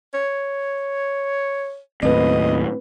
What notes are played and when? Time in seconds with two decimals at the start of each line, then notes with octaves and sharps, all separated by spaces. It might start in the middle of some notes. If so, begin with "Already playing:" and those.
0.14 C#5
2.03 D#2 A2 C4 B4 D#5